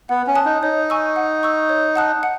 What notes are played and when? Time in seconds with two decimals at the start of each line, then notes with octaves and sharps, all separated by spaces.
0.09 B3 F#5
0.27 C#4
0.35 A5 D#6 F#6
0.46 D#4
0.62 D#4 C#5
0.90 G#5 C#6 E6
1.16 F#5
1.43 C#6 E6
1.69 C#5
1.96 F#5 A5 D#6 F#6
2.23 F#5